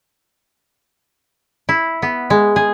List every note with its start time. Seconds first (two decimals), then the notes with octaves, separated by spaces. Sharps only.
1.69 E4
2.02 B3
2.30 G#3
2.56 G#4